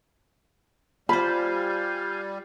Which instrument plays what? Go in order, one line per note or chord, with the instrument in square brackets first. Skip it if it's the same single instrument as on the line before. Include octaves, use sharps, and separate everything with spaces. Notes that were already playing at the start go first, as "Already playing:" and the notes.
[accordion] G3 [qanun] F4 C5 [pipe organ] F5 G#5 G6 [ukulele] B5